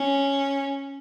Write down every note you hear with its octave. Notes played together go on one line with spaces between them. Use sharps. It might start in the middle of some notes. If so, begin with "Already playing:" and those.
Already playing: C#4